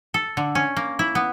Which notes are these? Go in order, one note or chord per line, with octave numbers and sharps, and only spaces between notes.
A4
D3
C#4
A#3
E4
B3